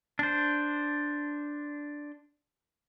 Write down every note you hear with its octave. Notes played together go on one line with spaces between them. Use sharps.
D4 C5